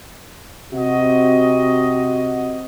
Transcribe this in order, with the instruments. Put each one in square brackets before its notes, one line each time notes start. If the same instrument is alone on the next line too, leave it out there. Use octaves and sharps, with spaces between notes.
[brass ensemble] C3 F#4 D#5